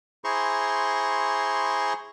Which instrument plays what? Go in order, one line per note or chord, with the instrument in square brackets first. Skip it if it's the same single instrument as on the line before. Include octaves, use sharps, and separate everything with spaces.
[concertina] E4 G#4 C5 A#5 C6 C#6